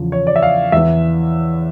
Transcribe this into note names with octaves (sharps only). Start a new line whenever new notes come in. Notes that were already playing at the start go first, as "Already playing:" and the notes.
Already playing: E2 C#3 F3
C#5
D5
E5
F5
E2 E3 E5